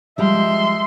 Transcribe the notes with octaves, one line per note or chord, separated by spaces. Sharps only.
F3 G3 G#3 E5 C6